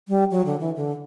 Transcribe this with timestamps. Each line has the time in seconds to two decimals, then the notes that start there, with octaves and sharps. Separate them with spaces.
0.09 G3
0.31 F#3
0.46 D3
0.60 E3
0.76 D3